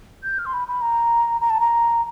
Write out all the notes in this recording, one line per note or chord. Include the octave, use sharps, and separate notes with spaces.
G6
F6
C6
B5
B5
A#5
A#5
A5
A#5